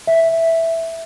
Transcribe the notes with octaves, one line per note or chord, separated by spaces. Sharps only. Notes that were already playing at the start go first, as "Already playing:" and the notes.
E5